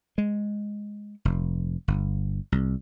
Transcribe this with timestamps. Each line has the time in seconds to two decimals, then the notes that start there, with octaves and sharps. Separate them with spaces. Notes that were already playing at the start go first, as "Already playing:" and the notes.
0.18 G#3
1.25 F1
1.88 G1
2.52 C2